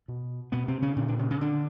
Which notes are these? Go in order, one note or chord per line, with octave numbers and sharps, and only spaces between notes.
B2
B2 B3
C3 C4
C#3 C#4
A#2 D3 D4
D3 D4
C#3 C#4
C#3 C#4
D3 D4